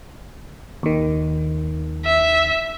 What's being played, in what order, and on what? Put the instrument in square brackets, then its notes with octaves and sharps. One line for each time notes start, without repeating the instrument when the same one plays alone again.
[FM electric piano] D#2 D#3
[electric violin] E5